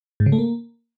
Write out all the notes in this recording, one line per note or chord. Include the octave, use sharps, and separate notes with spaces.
G#2
C#3
A3
A#3